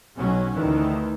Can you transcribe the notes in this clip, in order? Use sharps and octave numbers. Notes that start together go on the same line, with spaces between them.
B1 B2 F#3 C#4
D2 D#3 E3